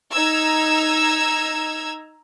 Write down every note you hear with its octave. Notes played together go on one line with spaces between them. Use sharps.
D#4 A#5 E6 G#6